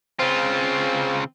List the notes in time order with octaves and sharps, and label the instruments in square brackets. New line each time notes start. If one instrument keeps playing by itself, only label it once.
[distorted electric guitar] C#3 F4 [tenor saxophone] C4